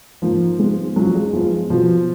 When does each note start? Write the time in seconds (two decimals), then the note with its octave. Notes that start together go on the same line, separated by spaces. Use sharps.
0.22 G#2 D#3 F3 A#3
0.59 D#3 G#3 B3
0.96 F#3 G#3 C#4 F4
1.15 G#3
1.33 F3 B3 F4 B4
1.70 B2 F3 F#3 B3